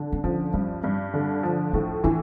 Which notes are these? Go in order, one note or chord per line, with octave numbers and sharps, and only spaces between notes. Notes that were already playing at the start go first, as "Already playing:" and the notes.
Already playing: D3
C4
F3 C#4
G2 C#4
G2
D3
F3
A2 D4
E3 D4